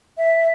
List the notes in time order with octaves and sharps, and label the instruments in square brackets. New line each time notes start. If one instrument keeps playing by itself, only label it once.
[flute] E5